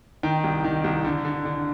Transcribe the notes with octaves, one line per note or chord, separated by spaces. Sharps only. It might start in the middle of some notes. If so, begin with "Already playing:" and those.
D#3 G5
C2
D#3
C2
D3
D3
D3